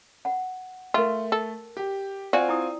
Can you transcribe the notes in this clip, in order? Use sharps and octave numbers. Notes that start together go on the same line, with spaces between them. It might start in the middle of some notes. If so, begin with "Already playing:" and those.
F#5
A3 F4 A#4 G5
A4
G4
C4 F4 F#4 D5 G#5
E4 G5 D#6